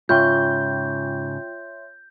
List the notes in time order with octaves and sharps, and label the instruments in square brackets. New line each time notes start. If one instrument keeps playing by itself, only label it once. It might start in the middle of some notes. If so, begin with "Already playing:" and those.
[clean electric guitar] G#2 C#3 [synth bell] F4 G5 [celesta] C#5 E5 C6 [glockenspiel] G6